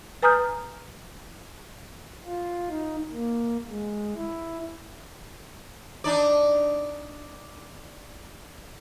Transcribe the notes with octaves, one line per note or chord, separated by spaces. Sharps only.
B4 G#5 A#5 D#6 F6 G6
F4
D#4
A#3
G#3
E4
D4 D#4 D5